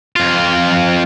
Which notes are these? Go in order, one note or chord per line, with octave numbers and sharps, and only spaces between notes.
F2 F4